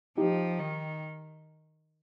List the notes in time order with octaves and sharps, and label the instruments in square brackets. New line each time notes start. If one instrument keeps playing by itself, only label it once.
[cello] F3 [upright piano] D#4 G4
[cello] D#3